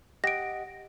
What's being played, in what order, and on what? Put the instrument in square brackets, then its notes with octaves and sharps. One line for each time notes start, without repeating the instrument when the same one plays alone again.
[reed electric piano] G4 D#5 F#5 [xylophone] A#6 D7